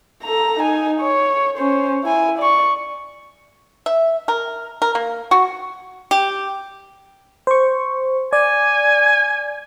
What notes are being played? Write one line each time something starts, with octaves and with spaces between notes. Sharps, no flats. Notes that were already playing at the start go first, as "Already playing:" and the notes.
A4 A#5
D#4 G#5
C#5
C#4 C5
E4 G#5
D5 C#6
E5
A#4
A#4
A#3
F#4
G4
C5 C#6
D5 G#5